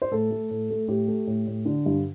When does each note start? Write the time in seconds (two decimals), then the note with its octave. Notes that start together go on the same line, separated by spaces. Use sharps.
0.02 C5
0.11 A2 A4
0.31 A3
0.51 A2
0.70 A3
0.88 A2 G4
1.08 A3
1.27 A2
1.47 A2
1.65 D3
1.86 G2